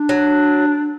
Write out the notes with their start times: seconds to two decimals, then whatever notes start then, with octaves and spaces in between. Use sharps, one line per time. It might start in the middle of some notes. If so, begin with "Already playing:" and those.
Already playing: D4
0.09 F#3